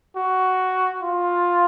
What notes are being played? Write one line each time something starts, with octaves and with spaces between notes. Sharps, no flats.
F#4
F4